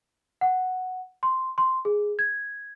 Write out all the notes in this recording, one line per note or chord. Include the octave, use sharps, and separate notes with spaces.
F#5
C6
C6
G#4
G#6